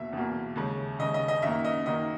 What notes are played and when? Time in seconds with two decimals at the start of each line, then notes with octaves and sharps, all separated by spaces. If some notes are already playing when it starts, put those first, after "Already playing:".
Already playing: E2 B2 A#3 E5
0.13 E2 B2 A#3
0.56 D#2 C#3 G#3
0.99 D#2 C#3 G#3 D#5
1.14 D#5
1.28 D#5
1.42 F#2 D#3 A#3 E5
1.64 D#5
1.86 F#2 D#3 A#3 D#5